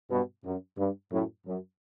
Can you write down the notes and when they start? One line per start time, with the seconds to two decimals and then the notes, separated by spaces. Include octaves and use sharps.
0.10 G2 B2
0.44 F#2
0.78 G2
1.12 F#2 A2
1.46 F#2